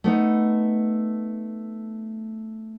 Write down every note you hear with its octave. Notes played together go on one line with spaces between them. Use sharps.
A3 B3 D#4